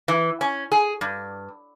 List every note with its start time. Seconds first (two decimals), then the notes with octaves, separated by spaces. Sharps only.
0.08 E3
0.41 C#4
0.72 G#4
1.01 G2